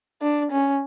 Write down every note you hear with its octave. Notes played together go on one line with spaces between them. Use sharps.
D4
C#4